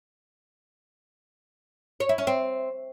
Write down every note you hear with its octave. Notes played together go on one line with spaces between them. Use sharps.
C#5
E4
C#4
C4